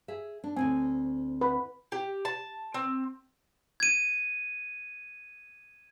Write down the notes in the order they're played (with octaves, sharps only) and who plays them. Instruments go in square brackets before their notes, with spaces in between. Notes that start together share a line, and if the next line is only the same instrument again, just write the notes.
[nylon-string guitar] G#4 E5
D4
[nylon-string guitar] D2 G2 C4 [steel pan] G#5
[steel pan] B4
[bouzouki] G4
A5
C4
[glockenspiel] G#6 D#7